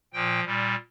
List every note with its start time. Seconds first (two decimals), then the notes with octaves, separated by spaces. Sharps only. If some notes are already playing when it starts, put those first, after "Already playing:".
0.13 A#2 F3 G5
0.44 A#2 G3